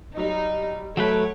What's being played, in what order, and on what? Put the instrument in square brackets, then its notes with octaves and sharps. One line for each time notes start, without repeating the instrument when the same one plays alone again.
[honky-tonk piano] F#3 G3 [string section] D#4
[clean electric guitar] F#3 A3 B4 [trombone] A4 [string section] C#5 [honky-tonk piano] D7